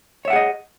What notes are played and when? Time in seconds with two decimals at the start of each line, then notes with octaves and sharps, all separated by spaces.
0.25 C#5
0.28 E5
0.30 F#5
0.33 G#4
0.36 D#5